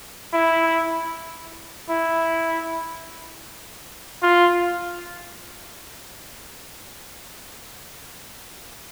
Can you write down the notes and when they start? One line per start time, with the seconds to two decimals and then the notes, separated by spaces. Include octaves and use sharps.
0.34 E4
1.89 E4
4.23 F4